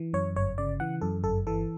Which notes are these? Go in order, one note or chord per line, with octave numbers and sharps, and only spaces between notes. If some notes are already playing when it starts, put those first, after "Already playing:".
Already playing: E3
F#2 C#5
G1 C#5
C#3 D5
E3 F#5
F#2 A4
G1 A4
E3 A4